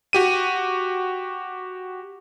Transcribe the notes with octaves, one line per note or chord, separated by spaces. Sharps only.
F#4 G4 D#7